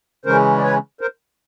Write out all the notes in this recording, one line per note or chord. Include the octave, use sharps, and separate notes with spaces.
C#3 E3 G#3 C#4 A#4 C5
D5
B4 C#5
A#4 C5